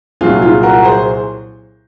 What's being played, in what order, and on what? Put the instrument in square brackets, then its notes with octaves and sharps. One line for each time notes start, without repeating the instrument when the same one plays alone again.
[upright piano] C2 A#2 F#3 F4 G#4
F4 G#4
F#4 A#4
G#4 C5